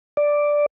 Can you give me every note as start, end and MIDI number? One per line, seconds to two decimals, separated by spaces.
0.17 0.66 74